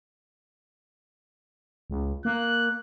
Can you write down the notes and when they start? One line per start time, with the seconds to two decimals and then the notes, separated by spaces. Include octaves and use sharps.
1.90 C#2
2.25 A#3 F#6